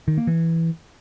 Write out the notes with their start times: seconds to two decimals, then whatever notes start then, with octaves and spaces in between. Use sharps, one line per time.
0.08 D#3
0.18 A#3
0.27 E3